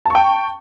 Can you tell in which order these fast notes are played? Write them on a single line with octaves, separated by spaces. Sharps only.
A5 C#6 G5